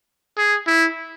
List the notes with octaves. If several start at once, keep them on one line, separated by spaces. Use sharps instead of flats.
G#4
E4